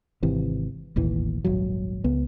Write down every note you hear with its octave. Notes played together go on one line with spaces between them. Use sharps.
G#1 C3 E3
E1 A1 D#2 E3
D#1 G#1 F#3
C#2 B3